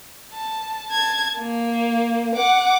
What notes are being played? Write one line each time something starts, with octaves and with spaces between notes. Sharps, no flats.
A5
A5 G#6
A#3
F#5 D6